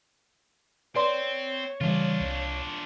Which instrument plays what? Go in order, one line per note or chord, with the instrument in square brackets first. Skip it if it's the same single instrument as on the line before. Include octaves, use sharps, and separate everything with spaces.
[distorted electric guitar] C4 [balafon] B4 D5 C6 [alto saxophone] C#5
[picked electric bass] C#3 E3 G3 [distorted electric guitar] D4 F4
[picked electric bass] C2